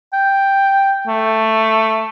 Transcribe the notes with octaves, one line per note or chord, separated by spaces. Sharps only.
G5
A3